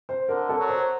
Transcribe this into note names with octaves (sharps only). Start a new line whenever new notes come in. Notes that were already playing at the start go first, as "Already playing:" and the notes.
C5
D3 A#4
A4
F#3
C5